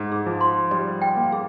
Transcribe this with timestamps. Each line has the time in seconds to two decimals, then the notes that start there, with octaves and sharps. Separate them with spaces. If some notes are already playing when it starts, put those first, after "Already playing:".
Already playing: G#2
0.12 G#4
0.26 F3
0.41 C6
0.71 G3 D5
1.02 G5
1.17 A#3
1.32 G#4